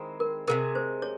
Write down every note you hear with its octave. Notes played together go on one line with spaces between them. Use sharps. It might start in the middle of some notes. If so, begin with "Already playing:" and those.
Already playing: D#3 G#3 C4 E4
A#4
C3 D#3 G#3 A#4
C5
C#5